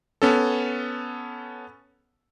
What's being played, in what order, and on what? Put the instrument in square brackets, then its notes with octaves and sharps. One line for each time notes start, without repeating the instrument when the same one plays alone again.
[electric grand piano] B3 C#4 A4